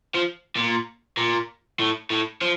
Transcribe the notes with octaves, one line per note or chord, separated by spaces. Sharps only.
F3
A#2
A#2
A2
A2
F3